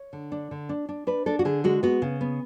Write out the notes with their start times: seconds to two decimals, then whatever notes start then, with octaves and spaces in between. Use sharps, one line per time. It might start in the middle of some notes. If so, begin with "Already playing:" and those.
Already playing: C#5
0.13 D3
0.32 D4
0.51 D3
0.69 D4
0.89 D4
1.07 D4 B4
1.26 D4 A4
1.39 F#4
1.45 D3 G#4
1.64 G#3 F#4
1.83 B3 F#4
2.02 C#3
2.21 B3